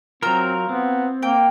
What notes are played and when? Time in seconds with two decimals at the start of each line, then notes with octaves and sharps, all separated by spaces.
0.23 F#3 C4 F4 A#4 A#5 E6
0.69 B3 C4
1.23 A#3 G5